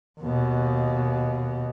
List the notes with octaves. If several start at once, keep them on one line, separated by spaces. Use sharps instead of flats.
D#2 B2